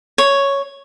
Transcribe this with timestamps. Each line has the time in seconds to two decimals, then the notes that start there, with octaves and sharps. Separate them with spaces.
0.18 C#5